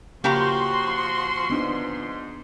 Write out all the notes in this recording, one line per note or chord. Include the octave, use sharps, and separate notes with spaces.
C#3 F3 A#3 F#4 G4 A#5 C6
G#2 B3 D4 D#4